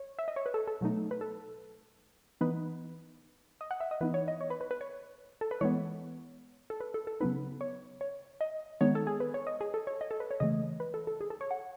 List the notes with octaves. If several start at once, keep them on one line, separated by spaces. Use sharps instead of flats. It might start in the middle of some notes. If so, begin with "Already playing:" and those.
Already playing: C#5
E5
D#5
C#5
B4
A4
A4
B2 F#3 A3 D#4
B4
A4
E3 B3 D#4 B4
D#5
F#5
E5
D#5
E3 B3 D#4 B4
C#5
D#5
C#5
B4
B4
B4
C#5
A4
B4
E3 G#3 B3 C#5
A4
B4
A4
A4
C#3 F#3 B3 D#4 B4
C#5
C#5
D#5
D#3 G#3 B3 D#4 C#5
A4
G#4
B4
C#5
D#5
G#4
A4
C#5
D#5
A4
B4
C#5
C#3 E3 A3 D#5
B4
A4
A4
G#4
A4
C#5
F#5